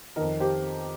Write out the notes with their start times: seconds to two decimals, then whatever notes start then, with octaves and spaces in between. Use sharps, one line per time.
0.16 F2 D#3 A#4 D#5
0.40 G4 C5